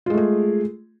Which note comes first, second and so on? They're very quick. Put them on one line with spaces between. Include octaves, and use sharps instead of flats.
F4 G#3 A3 G#4